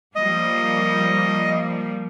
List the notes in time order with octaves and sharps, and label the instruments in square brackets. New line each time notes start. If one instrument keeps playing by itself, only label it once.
[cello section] F3 G3 A#3 [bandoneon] D#5